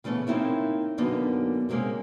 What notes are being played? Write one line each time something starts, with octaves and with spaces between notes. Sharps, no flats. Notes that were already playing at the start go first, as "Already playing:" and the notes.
C#3 E3 A3 B3 C#4
A#3 C4 D#4 E4 C#5
F#2 B2 D3 A#3 B3 D#4
C3 G3 G#3 A#3 C4 C#4